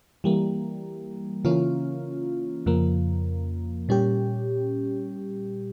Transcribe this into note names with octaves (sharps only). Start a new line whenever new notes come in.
E3 G3 A#3
C#3 E3 A#3 C#4 F4
F2 C#3 F3 A#3
A#2 G3 C#4 G4